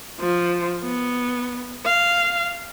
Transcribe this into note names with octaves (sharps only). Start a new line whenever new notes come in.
F3
B3
F5